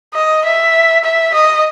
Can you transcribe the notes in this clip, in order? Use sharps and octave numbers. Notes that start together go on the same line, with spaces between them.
D#5
E5
E5
D#5